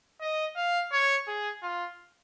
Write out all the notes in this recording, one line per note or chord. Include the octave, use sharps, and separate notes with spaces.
D#5
F5
C#5
G#4
F4